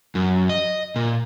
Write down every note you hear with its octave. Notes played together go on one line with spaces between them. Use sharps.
F#2
D#5
A#2